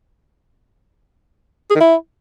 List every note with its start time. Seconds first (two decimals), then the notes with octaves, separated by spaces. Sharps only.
1.70 G#4
1.75 D#3
1.80 E4